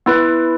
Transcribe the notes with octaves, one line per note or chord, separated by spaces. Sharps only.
B3 E4 B4